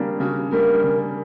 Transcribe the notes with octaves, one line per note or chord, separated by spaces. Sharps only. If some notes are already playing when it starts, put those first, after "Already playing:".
Already playing: C#3 G3 A#3 D4
C#3 F#4
G3 A#3 D4 A#4
C#3